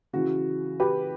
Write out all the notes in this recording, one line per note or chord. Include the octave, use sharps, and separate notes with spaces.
C#3 E3 F#4
G4 B4